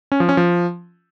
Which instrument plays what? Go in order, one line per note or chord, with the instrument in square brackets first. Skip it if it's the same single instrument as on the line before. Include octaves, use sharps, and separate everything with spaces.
[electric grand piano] C#4
F3
C#4
F3